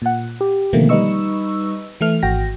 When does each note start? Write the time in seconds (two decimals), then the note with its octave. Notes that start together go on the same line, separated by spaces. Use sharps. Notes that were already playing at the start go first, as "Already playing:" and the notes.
0.02 A#2 F#5
0.41 G4
0.73 B2 D3 D#3 F3 A3 A#3
0.89 G3 D#4 B4 D#5 C#6 E6
2.01 E3 A3 F6
2.23 G#1 F#4 G5 A#6